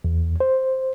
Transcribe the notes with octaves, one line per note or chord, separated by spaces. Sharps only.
E2
C5